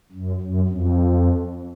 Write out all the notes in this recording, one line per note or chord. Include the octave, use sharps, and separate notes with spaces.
F#2
F#2
F2